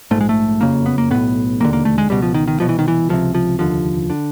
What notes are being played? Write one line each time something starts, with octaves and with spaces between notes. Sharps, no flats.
A#1 G#2 A3
G#3
A3
F#1 F2 C#3 A#3
B3
A#3
B1 A2 B3
E1 D#2 D3 A#3
A#3
A3
G#3
C#2 B2 G3
F3
D#3
D#3
C2 B2 F3
E3
D#3
E3
C#2 C3 F3
F3
F1 D#2 D3 F3
D3